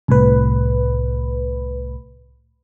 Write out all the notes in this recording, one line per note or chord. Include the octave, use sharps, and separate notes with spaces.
C2 A2 B4